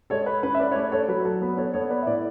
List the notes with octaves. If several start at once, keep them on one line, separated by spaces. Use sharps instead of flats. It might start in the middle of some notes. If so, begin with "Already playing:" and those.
G#3 A4 C#5
B4
C#4 B4
E5
B4 D5
C#5
A3 B4 D5
A4 C#5
F#3 B4
A4
B3 B4
A4 C#5
B3 A4 C#5
B4 D5
E5
A2 B4 D5